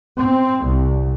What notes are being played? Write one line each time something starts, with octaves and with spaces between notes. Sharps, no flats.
C4
C2